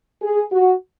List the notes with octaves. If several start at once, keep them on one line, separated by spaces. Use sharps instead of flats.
G#4
F#4